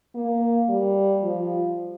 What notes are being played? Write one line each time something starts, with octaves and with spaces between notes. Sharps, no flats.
A#3
G3
F3